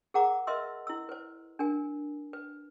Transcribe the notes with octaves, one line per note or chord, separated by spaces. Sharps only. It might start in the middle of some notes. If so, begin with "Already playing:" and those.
G#4 A#4 F#5 A#5 D6
A#4 B4 D#5 E5 C6 E6
E4 E6
B4 C5
D4 A#4 G#5
B4